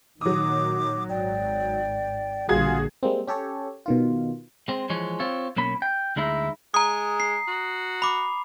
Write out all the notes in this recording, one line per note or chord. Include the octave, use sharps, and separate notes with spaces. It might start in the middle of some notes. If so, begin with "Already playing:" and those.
A#2 D#3 F#3 D6 D#6
G#1 D5 G5
A#1 D3 G3 F4 F#4 G#4 F5 G#6
G3 G#3 A#3 C4
C#4 G4 A4 C#5
B2 D#3 F4
G#3 C4
E3 F3 G#3 C#5
C4 F4 C#5
B1 A#3 C#4 B5
G5
D2 G#3 D#4 E4
G#3 A#5 D#6
C7
F#4
B5 D6